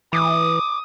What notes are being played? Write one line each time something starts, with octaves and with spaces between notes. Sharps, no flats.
E3 D6 D#6